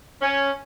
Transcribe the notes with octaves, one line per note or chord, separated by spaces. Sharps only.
C#4